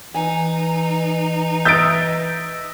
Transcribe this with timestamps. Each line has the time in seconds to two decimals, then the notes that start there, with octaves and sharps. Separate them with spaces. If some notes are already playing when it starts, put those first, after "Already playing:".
0.14 E3 D#4 G#5
1.65 D#5 E5 G6 A6 D7